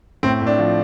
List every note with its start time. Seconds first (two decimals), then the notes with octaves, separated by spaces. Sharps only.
0.23 A2 C4
0.41 A2
0.47 D4
0.59 F3